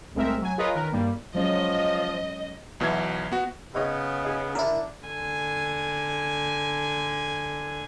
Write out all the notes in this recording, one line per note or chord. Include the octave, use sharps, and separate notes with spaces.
C2 A2 G#3 C4 A#4 E5
F#3 G#5
F4 G#4 A#4 B4 C#5 D#5
D#3 A#4 B4
G2 G3 A#3
F3 F#3 G#3 C#4 D#5
B1 B2 E3 E5 G#6
B3 F#4
C#3 B3 D#4 C#5 D#5
D#4 G#4
D3 D4 E4 A#4
D3 G#5